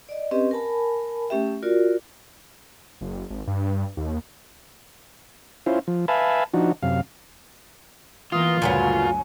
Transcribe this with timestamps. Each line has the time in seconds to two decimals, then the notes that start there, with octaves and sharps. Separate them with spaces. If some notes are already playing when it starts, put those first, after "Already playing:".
0.09 D5 D#5
0.31 C4 C#4 G4 B4 D#5
0.51 A#4 G#5 A5 B5
1.29 A3 C#4 G4 E5 G5
1.63 F4 F#4 A#4 D5
3.01 F#1
3.30 G#1
3.47 G2
3.97 D#2
5.66 C#4 E4 F4 C5
5.87 F3
6.08 B4 E5 F5 G#5 A5 B5
6.54 F3 D4 D#4 F#4
6.83 F#2 C3 F5
8.32 E3 A#3 B3 F4 D#6
8.62 G1 D2 A#2 C#3 F#3 B3 G#5